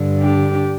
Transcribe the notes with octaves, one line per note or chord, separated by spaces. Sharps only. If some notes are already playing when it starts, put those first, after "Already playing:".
Already playing: G2 D3
D4 G4